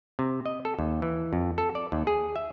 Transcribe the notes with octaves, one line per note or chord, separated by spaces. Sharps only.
C3
D#5
A4
D#2
E3
F2
A4
D5
D#2
G#4
E5